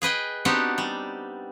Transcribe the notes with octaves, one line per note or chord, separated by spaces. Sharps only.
G#4 B4 D#5 G5
B3 C4 D4 D#4 F#4 G4
G3